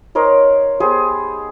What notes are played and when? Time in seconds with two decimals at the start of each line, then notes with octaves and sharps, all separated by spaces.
0.15 D#4 A#4 C5 C#5
0.80 B3 G4 G#4 C5